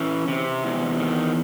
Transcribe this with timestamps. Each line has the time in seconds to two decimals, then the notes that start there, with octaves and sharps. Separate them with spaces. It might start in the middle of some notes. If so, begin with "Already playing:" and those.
Already playing: E3 C#4
0.28 C3
0.64 E2
0.99 D#3